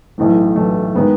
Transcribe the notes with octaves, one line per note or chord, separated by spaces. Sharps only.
B1 A2 E3 A3
B1 A2 E3 A3
D#3 G#3 B3